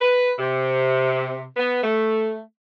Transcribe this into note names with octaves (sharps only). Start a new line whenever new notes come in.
B4
C3
B3
A3